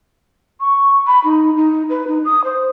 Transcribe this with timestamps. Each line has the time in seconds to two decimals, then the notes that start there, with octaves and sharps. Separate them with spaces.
0.60 C#6
1.07 B5
1.24 D#4
1.56 D#4
1.89 B4
2.07 D#4
2.25 D#6
2.44 C5